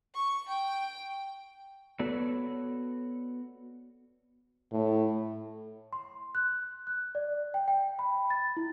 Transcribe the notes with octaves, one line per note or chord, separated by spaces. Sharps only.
C#6
G5
B3 F#4 A4 B4 C#5 D5
A2
C6
F#6
F#6
D5
G5
G5
B5
A6
E4